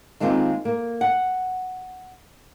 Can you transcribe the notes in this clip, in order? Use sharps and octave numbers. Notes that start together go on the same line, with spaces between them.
D#3 G#3 A#3 C4 F4
A#3
F#5